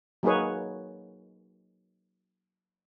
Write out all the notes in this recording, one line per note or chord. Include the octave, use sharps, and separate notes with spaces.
F#3 A#3 D#4 G#4 B4 C#5